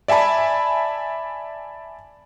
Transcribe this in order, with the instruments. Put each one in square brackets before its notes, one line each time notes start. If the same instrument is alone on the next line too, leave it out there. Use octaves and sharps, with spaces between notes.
[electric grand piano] D5 E5 G#5 A5 B5